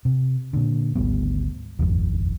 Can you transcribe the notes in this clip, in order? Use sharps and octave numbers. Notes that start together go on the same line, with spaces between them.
C3
A#2 D3
G#1 D2 G3 B3
D#1 G#1 F2